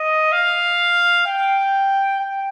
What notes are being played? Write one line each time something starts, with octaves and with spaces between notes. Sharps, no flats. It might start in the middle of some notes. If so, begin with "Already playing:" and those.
Already playing: D#5
F5
G5
G5